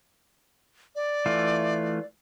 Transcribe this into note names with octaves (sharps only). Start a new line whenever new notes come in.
D5
E3 A3 F4